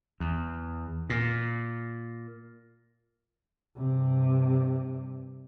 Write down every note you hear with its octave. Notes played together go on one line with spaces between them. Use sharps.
E2
A#2
G2 C3